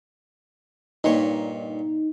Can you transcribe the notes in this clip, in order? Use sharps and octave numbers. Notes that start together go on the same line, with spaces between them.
G2 A#2 D#4 C#5